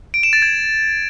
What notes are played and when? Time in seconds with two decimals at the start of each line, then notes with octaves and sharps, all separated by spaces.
0.14 D7
0.23 E7
0.33 A6
0.42 G#6